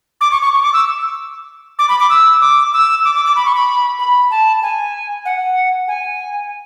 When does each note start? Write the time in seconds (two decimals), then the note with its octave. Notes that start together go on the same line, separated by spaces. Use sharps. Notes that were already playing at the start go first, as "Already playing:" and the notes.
0.21 D6
0.32 C#6
0.42 C#6
0.54 C#6
0.63 D6
0.73 E6
1.79 D6
1.89 B5
1.99 D6
2.10 E6
2.42 D6
2.73 E6
3.04 D6
3.15 D6
3.25 D6
3.36 B5
3.45 C#6
3.55 B5
3.99 B5
4.31 A5
4.62 G#5
5.25 F#5
5.88 G#5